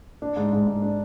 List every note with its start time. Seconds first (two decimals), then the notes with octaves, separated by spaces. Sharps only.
0.22 D4
0.37 G#2
0.53 G#2
0.67 G#2
0.82 D4